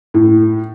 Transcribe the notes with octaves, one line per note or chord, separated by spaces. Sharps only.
A2